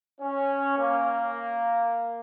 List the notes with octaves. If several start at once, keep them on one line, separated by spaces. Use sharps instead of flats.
C#4
A#3